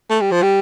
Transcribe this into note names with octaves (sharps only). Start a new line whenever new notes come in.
A3
G3
F3
G3